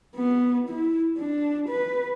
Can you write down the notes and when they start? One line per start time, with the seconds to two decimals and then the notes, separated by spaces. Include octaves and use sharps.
0.16 B3
0.69 E4
1.17 D4
1.69 B4